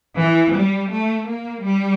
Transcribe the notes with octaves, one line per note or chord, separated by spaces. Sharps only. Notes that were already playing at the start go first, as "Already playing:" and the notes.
E3
G3
A3
A#3
G3